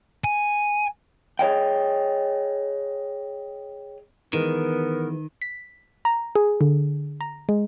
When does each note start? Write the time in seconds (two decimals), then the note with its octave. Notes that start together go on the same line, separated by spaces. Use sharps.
0.24 G#5
1.39 G#4 C#5 D#5 G5
4.33 D#3 E3 G#3 B3 A#4
5.42 B6
6.05 A#5
6.35 G#4
6.61 D3
7.21 A#5
7.49 G#3